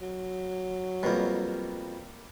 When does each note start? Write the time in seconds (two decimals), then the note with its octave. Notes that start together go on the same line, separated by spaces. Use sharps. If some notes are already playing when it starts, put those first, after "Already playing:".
0.01 F#3
1.03 F2 B2 G3 A#3